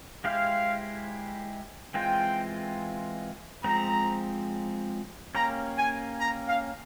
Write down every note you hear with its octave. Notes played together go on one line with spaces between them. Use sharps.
G#3 E4 G4 C5 F5
E3 G#3 C4 F4 G5
F3 G#3 C4 A#5
A#3 C#4 G4 A#5
G#5
A#5
F5